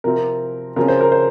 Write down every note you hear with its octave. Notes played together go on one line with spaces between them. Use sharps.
C3 F3 C4 A#4
C#3 F3 C4 A#4
C5
A#4
C5